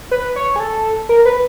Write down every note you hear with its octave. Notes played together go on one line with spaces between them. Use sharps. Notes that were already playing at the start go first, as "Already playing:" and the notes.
B4
C#5
G#4
A4
A#4
B4